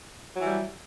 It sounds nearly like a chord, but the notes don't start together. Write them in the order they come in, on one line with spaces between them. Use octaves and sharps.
F#3 E3 G3